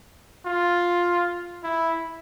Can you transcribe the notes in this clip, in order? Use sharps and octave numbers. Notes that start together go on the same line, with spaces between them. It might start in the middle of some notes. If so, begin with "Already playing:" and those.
F4
E4